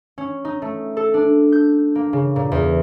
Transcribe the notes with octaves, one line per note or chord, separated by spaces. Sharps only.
C#4
D#4
A3
A4
D4
G6
A#3
C#3
A#2
E2